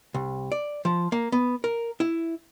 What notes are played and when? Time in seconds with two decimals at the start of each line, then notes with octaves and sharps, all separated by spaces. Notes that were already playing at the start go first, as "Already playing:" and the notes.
0.14 C2
0.52 D5
0.85 F3
1.12 A#3
1.32 B3
1.64 A#4
2.00 E4